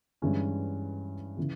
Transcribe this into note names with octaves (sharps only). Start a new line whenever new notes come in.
G2 E3 G#3 C#4 E4
C#3 E3